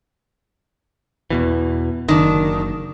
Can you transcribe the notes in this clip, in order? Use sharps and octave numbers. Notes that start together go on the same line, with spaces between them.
E2 B2 E3
F#1 D#3 D4